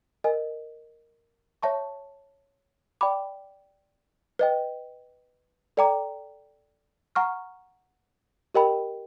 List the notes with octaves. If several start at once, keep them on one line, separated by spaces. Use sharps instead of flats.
A#4 D#5 G#5
C#5 E5 A5 C#6
D5 G5 B5 D6
B4 D#5 G5
A4 D5 G5 A#5 D6
F#5 A#5 C#6 F6
G4 A#4 D#5 G5 B5